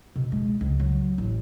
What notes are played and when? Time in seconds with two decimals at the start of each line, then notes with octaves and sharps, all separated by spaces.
0.16 B2
0.32 G#3
0.61 C#2
0.80 F#3
1.18 A1